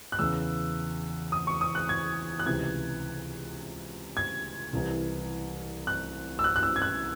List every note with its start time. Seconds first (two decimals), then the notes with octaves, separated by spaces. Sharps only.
0.12 F#6
0.19 E2 C#3 E3 E6
1.32 D#6
1.47 C#6
1.61 D#6
1.75 F#6
1.89 G#6
2.40 F#6
2.46 C#2 C3 E3 G#6
4.17 G#6
4.73 C2 C3 E3
5.87 F#6
6.39 E6
6.44 F#6
6.56 F#6
6.63 E6
6.76 G#6
6.82 F#6